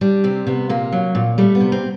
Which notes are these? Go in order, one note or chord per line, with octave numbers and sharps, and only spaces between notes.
G3 D4
C3 C4
C3 B3
A#2 A#3
F#3
A#2
G3 A3
B3
C3
C4